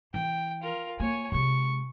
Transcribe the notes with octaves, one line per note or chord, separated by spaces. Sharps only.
E3 G5
F4 A#4
A#3 C#5 G#5
C3 G#3 C#6